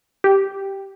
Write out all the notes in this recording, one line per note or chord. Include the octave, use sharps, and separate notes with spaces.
G4